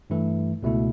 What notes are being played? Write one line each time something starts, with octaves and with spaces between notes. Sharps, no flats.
G2 E3 A3 E4
C#2 B2 A3 E4